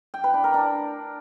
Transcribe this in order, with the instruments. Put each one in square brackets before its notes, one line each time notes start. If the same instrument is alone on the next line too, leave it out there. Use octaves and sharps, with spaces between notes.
[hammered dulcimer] G5
B4
D4
A#4
D4